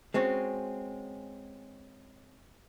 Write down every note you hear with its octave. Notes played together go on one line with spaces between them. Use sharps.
G#3 C4 C#4 F#4